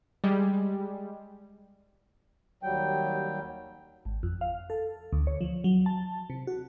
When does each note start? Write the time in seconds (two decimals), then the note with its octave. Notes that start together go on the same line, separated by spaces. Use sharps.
0.24 G3 G#3
2.63 D#2 F#3 G3 G5
4.05 G#1
4.23 F2
4.41 F5
4.70 A4
5.13 D2
5.27 C#5
5.41 F3
5.64 F#3
5.86 A5
6.30 C3
6.47 F#4